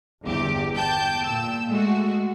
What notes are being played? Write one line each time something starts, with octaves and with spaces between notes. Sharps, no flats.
G1 E2 G4
G5 A5 G6
A#2 E6
G#3 A3 F#4